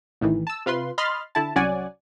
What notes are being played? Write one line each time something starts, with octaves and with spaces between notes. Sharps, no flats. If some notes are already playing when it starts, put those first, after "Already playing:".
A1 A2 D#3 E3
A5 E6
C3 F4 B4 C6
D#5 B5 C6 F6 A6
D3 E4 A5
C2 F#3 C#4 D5 F#5 G#5